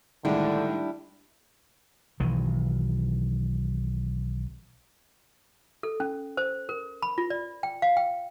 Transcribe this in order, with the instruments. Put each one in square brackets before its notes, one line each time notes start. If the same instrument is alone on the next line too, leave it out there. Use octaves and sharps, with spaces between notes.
[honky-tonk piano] A2 D#3 G#3 [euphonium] D3 [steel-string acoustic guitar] G3 D4 E4
[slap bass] B1 D#3 E3
[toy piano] A4
C#4
C5
A#4
B5
F4
D5
G5
F5
G5